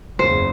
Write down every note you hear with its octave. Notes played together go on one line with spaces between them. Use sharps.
F#1 E2 C#3 C5